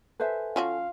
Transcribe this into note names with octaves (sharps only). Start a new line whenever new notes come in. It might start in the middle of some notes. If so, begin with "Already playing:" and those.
A4 B4 C5 E5 G#5
F3 C#4 F4 F#4 F5